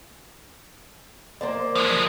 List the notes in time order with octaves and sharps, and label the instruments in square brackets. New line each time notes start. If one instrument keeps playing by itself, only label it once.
[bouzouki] A#3 C5 D5
[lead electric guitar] F3 G#3